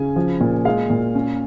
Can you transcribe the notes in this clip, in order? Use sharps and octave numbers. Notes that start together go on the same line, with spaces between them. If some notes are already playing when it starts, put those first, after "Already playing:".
Already playing: C#3 C#4 G#5
F3
A#2
G#3 F5
A#2
C#4